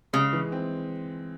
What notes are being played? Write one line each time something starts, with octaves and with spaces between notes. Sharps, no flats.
C#3 G#3
E3
C4